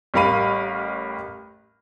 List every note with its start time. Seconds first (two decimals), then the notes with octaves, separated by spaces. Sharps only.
0.14 A1 G3 A#4 F5 B5 D#7